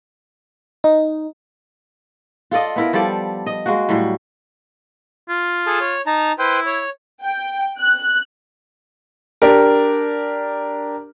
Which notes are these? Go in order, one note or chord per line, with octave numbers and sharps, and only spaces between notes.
D#4
F4 A4 D5 D#5
B3 E4 A#4
F3 G3 A4 D5
D#5
G#3 A#3 F#4
A2 F#3 G3
F4
G#4 A4 A5
C#5
D#4 A5 A#5
E4 B4 C5 G5
C#5
G5
F#6
D4 G4 A#4